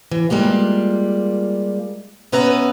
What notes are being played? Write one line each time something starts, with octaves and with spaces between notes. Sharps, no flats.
E3
G3 G#3 A#3 F4
B2 B3 C#4 B4 E5 A#5